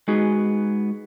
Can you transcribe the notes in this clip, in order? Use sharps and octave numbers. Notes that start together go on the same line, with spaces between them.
G#3 B3 D#4 F#4 G#4